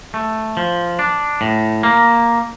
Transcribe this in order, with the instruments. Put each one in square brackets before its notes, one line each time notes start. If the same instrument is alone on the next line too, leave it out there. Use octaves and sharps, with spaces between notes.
[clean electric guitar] A3
F3
D4
A2
A#3